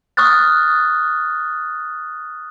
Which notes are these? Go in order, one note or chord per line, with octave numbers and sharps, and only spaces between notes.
C#6 D#6 F6 F#6 A6